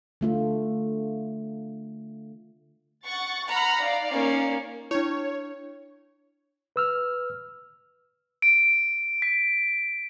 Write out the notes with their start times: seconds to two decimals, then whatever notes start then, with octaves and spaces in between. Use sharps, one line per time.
0.21 D3 A3 F4
3.05 F#5 C#6 A6
3.48 F#5 A#5 B5 F6
3.81 D#4 D5 F5
4.11 A#3 C#4
4.91 D4 E4 C#5
6.76 B4 E6 F6
8.42 D7
9.22 B6